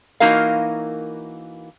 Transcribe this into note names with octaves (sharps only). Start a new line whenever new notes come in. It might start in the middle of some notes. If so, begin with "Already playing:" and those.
E3 A#3 D#4 F#4 A#4 F5